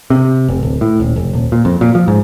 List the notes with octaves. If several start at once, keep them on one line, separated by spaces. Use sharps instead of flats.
C3
F1
D1
A2
D#1
F1
D#1
A#2
F2
A#2
F3
G#2